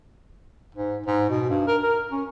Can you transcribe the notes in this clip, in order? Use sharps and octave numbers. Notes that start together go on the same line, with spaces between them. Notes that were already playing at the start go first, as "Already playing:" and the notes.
G#2
G#2
B2
G2
A#4
A#4
C#4